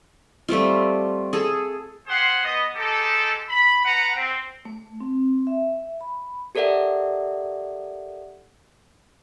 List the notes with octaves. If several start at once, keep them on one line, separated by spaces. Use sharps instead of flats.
G3 A3 C4 F4
G#4 A4
F4 G4 G#4 C5 F#5 C6
B3 D#5
G#3 D#4 G4 A4
B5
B4 F#5 A#5
C4
A3
C4
E5
B5
G4 A4 A#4 D5 E5 F#5